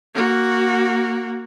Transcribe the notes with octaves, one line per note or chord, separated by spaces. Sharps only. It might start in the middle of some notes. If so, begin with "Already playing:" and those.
A#3 F#4